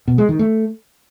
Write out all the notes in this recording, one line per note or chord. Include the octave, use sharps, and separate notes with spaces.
B2
G#3
D#3
A3